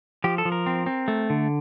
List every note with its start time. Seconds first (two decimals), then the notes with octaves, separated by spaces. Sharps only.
0.24 F3 G4
0.38 A4
0.45 F3
0.52 A#4
0.66 C4
0.86 C4
1.08 A3
1.30 D3